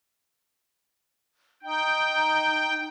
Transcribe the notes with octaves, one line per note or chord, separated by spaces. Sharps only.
D#4 G5